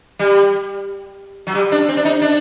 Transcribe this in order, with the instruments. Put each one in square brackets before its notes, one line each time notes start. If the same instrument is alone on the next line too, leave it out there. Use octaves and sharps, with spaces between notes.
[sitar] G3
F#3
G3
D4
C4
D4
D#4
D4